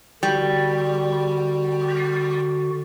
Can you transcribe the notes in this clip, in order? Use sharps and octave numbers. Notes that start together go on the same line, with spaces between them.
D3 G3 F#4